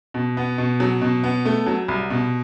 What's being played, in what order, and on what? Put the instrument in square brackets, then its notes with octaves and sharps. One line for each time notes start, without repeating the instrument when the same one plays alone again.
[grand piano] B2
B3
B2
F#3
B2
B3
A3
F#3
C2
B2